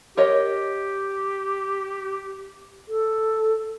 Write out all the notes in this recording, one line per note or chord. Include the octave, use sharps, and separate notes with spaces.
G4 A#4 C#5 D#5
A4